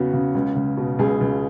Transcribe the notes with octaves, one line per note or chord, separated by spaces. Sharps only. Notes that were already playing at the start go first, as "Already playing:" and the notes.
Already playing: E2 C#3 F#3 B3 F#4
C#3
C#2
C#2
B2
C#2 G#4
C#2